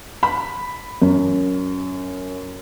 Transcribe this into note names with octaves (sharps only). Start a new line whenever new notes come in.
B5
F#2